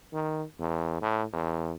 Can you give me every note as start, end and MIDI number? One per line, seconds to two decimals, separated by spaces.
0.13 0.44 51
0.60 0.98 40
1.02 1.24 45
1.33 1.73 40